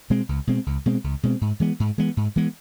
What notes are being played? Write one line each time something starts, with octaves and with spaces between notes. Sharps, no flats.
B2 G#3 C4
C#2
B2 G#3 C4
C#2
B2 G#3 C4
C#2
B2 G#3 C4
G#2
E3 G#3 B3
G#2
E3 G#3 B3
G#2
E3 G#3 B3